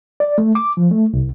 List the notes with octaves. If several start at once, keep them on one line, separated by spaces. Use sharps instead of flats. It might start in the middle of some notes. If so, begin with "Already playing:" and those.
D5
A3
D6
F3
A3
C2